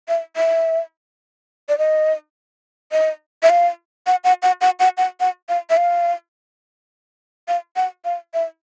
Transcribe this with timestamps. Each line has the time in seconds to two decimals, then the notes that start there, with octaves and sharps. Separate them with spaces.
0.08 E5
0.36 E5
1.69 D5
1.78 D#5
2.92 D#5
3.43 E5
3.50 F5
4.07 F#5
4.24 F#5
4.43 F#5
4.61 F#5
4.80 F#5
4.97 F#5
5.20 F#5
5.49 F5
5.70 E5
5.77 F5
7.48 F5
7.76 F#5
8.05 F5
8.34 E5